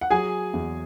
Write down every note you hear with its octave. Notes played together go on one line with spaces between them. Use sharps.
F#5
F#3 G#4 G#5
E2